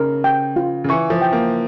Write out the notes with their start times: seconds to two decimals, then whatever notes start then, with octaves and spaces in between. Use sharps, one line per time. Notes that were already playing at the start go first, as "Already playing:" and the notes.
Already playing: C#3 A#4
0.24 G5
0.56 F4
0.84 C#3
0.89 E3 C#6
1.10 F3
1.22 G5
1.32 A#3